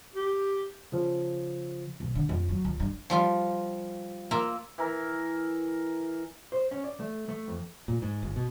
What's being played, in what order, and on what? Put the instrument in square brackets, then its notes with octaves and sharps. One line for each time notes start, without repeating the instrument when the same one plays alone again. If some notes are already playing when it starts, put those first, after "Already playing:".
[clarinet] G4
[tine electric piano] C#3 F3
[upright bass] B1
D3
F2
F#3
C#2
G2
[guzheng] F3 G3 F4
A#3 F4 E5 A#5
[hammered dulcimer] E3 A#4
[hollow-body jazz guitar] C5
C#4
D5
A3
A3
F2
[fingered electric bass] A#2
G#2
G1
B2